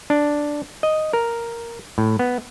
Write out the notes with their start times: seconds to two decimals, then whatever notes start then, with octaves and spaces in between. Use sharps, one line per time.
0.10 D4
0.83 D#5
1.13 A#4
1.98 A2
2.19 B3